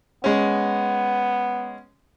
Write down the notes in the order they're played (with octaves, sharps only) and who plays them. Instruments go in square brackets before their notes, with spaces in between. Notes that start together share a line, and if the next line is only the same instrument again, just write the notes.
[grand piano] G#3 C#4 [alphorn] B3